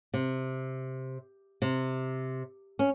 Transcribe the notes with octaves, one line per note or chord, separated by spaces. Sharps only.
C3
C3
C#4